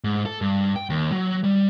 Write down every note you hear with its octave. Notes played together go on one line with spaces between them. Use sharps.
G#2
A4
G2
G5
D#2
F#3
G3